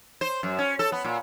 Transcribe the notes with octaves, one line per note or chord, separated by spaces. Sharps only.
C5
F#2
C#4
A4
B3
A#2